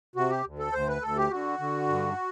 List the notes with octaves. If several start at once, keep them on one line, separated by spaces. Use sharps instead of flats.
C3 F#4
G4
D2
A4
D2 C5
B4
D2 A4
G4
D3 F#4
D3
G2